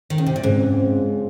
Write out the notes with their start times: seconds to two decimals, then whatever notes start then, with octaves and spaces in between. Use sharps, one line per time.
0.10 D#3
0.18 C#3
0.26 C3
0.36 A#2
0.43 C#2 G#2 C#3 F3 G#3 C4